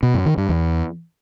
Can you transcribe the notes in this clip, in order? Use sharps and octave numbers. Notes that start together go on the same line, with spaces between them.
B2
F#2
D#3
G2
E2